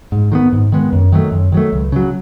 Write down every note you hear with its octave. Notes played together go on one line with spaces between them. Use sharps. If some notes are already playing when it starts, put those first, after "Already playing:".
G#2
D#3 G#3 B3
G#2
D#3 G#3 B3
F#2
D#3 F#3 A3
F#2
D#3 F#3 A3
C#2
C#3 F#3